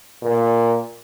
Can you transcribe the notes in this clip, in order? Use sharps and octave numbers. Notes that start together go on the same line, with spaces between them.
A#2